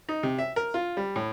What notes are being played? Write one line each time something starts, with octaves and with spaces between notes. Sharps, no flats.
D#4
C3
E5
A#4
F4
G3
A2